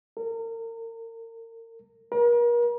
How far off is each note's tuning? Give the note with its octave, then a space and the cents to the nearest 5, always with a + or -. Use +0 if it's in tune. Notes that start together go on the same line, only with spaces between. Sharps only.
A#4 -35
A#4 +40